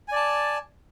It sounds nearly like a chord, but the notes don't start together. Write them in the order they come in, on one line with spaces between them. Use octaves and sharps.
G#5 D5 A5